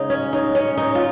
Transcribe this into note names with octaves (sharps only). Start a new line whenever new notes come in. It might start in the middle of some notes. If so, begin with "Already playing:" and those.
Already playing: C#3 G#3 D#4
C#4
D#4
C#4
D#4
F4